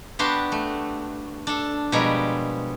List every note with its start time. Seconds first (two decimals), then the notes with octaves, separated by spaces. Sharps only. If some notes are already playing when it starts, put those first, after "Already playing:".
0.19 B3 D4 F#4 G4 A5 C6
0.52 A3
1.47 D4 A4
1.92 B2 F3 G3 G#3 A#4